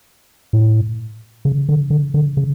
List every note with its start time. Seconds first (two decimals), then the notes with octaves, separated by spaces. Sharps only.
0.53 A2
1.45 C#3
1.69 D3
1.90 D3
2.14 D3
2.37 C#3